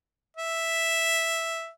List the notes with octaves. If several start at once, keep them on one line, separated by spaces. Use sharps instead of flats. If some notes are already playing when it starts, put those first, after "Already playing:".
E5